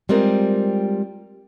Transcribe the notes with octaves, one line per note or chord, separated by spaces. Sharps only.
G3 G#3 C4 F4 A#4